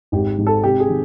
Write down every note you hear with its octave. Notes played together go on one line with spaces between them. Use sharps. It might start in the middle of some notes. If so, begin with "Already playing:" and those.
G#1 G4
G#2
A4
C3 G4
G#4
D#3